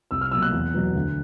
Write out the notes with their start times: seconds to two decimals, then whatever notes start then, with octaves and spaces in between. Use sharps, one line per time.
0.11 C2 E6
0.21 F6
0.31 B2 F#3 A#3 E6
0.42 F#6
0.53 E2
0.74 B2 F#3 B3
0.95 D2